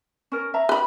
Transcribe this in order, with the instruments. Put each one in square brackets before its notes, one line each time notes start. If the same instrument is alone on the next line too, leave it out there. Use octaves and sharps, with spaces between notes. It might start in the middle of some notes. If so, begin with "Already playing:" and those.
[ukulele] C#4 A#4
E5 A#5
[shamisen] B4 B5